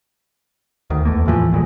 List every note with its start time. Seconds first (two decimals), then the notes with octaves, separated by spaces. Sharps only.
0.90 D2 D#3
1.05 E2 A3 A#3
1.26 D#2 A2 E3 F3
1.52 B1 A#2 G#3